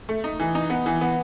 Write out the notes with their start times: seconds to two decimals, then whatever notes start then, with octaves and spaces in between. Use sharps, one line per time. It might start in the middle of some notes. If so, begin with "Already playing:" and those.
0.09 A3
0.24 D#4
0.40 E3
0.55 D#4
0.70 B3
0.86 E3
1.01 B3